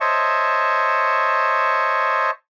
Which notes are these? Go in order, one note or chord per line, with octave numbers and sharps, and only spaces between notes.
C5 C#5 D#5 E5 A5 C#6